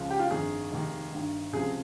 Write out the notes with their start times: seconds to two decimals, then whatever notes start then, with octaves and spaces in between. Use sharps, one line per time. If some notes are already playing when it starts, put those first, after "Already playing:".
Already playing: C#2 C#3 F3
0.10 G4
0.19 F4
0.31 G1 F2 D#3 G#4
0.71 F1 D#2 D#3
1.12 G1 G2 D#3
1.53 C#2 C3 F3 G#4